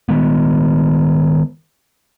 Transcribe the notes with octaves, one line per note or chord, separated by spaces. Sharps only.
D#3 G#3 B3